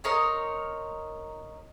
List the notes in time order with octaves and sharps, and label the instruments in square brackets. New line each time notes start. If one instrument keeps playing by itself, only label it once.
[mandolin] D#4 A#4 C#5 C6